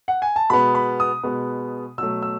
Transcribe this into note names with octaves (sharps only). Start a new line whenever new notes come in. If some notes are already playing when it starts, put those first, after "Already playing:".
F#5
G#5
A5
B2 G#3 B3 B5
B5
D#6
B2 G#3 B3
B2 F#3 A3 E6
E6